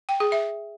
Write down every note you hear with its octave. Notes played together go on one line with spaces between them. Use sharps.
G5
G#4
E5